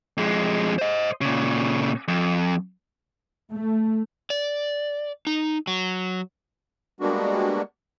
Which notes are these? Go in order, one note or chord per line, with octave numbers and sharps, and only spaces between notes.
F2 G#3
C5 D#5
A#2 C#3
F2
A3
D5
D#4
F#3
G3 G#3 A#3 B3 D4 F#4